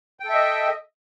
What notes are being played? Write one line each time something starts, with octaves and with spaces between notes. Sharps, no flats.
A4 D#5 E5 G5